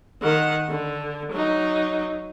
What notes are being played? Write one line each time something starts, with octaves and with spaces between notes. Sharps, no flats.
D#3 F#5
D3
F#3 D#4